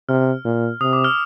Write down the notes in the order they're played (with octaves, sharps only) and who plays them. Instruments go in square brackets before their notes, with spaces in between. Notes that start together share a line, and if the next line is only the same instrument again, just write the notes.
[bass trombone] C3 [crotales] F6
[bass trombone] A#2
[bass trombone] C3 [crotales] D#6
[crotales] D6
F6